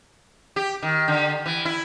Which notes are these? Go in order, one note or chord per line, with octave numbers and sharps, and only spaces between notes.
G4
D#3
D3
E3
E4